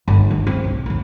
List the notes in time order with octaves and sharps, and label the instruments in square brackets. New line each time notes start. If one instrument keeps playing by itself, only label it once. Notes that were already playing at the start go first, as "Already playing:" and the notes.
[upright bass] G1 D#3
D#3
C4
B1
A1 D#2